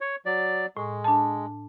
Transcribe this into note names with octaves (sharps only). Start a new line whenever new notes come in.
C#5
F#3 D5
A2 G#3
D4 A5